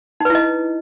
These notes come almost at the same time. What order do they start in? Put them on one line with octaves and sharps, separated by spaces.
D#4 B4 E4 D#5